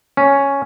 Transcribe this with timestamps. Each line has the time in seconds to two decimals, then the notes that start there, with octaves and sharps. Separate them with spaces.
0.17 C#4